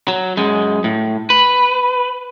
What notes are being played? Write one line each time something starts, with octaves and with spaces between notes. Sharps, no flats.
F#3
F#2 G#3
A2
B4